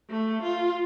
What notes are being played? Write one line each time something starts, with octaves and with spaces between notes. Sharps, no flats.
A3
F4